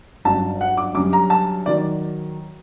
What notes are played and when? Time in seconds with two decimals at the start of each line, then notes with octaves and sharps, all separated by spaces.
0.25 G1 F#2 F#3 A5
0.61 F#5
0.77 D6
0.95 F#2 D3 G3 D6
1.13 A#5
1.30 A5
1.66 D#3 F#3 D5